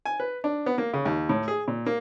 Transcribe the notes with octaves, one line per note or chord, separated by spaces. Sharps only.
G#5
B4
D4
B3
A#3
C#3
D#2
A2
G#4
A#2
A#3